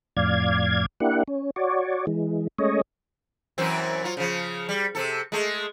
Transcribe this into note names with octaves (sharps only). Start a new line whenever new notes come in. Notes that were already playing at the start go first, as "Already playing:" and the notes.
F2 A2 D5 F5 G#6
A#3 D4 E4 G4 F#5
C#4
F#4 C#5 D5
E3 G#3
G#3 A3 C#4 C#5 D#5
F#2 E3 C4
F#3 F4
C#3 F3
G3
C3 A4
G#3 A3